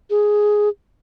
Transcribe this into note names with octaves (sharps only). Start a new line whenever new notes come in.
G#4